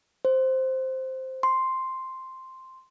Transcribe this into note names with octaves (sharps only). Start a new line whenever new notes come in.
C5
C6